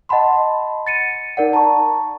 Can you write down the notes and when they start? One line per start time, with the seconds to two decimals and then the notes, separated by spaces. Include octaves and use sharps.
0.09 D#5 F#5 A5 B5 C6
0.87 A6 C#7 D#7
1.37 D#4 A#4 D5 F#5
1.53 A5 A#5 C#6